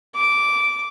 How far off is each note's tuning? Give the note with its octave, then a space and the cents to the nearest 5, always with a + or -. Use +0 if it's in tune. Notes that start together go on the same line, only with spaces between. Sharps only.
D6 -10